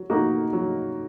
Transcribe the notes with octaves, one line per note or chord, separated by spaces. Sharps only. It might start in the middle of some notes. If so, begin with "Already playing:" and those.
Already playing: F#3
A#3 D#4 F#4
F#3